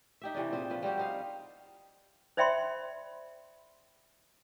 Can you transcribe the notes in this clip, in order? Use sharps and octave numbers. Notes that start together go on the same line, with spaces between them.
D#4 G4 E5
C3 E3 C#4 D4
A#2 C4 G#4
F3 C#4 B4
G3 C4 F#4 G4
C4 D#4 F5
C5 D5 E5 G5 B5 C6